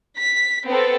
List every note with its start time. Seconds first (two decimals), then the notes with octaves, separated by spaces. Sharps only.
0.18 B6
0.65 B3 C4 A4